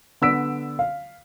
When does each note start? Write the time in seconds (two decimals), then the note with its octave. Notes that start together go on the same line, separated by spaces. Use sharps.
0.21 D3 B3 E6 B6 D7
0.79 F5